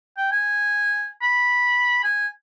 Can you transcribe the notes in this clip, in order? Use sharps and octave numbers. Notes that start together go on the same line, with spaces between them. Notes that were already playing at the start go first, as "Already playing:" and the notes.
G5
G#5
B5
G#5